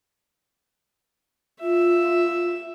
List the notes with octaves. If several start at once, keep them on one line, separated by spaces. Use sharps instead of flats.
F4 E5